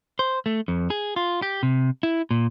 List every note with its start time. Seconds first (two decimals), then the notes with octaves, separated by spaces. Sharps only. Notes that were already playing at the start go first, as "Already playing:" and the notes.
0.19 C5
0.46 A3
0.68 F2
0.90 G#4
1.16 F4
1.42 G4
1.63 C3
2.03 E4
2.31 A#2